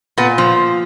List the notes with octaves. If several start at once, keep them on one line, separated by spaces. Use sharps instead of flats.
A#2 B3
F3